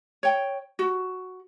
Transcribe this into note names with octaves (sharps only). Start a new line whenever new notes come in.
C#5 G5
F#4